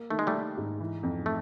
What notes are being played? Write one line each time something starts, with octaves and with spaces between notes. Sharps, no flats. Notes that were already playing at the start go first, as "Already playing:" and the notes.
Already playing: A#3
D#3 A3
G#3
G3 A3
D#3
G#2
E3
F2
A3